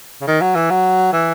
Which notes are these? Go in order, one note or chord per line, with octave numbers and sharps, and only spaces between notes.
C#3
D#3
F#3
E3
F#3
E3